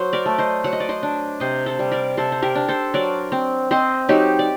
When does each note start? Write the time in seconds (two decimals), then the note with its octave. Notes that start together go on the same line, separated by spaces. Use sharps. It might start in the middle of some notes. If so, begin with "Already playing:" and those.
Already playing: F#3 C5
0.13 A#4 D5
0.26 A3
0.38 C5 D#5
0.64 F#3 F#5
0.73 D#5
0.80 D5
0.89 C5 D#5
1.03 D4
1.40 C3 C5 D#5
1.66 A4 C5
1.79 G3
1.92 A#4 D5
2.17 C3 A4 C5
2.32 C5
2.42 G4 A#4
2.55 D4
2.68 A4 C5
2.94 F#3 A#4 D5
3.32 C4
3.71 C4 C5 D#5
4.09 F#3 D#4 G4
4.39 D5